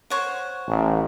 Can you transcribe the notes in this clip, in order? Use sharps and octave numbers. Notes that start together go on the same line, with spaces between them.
C5 C#5 F#5
A1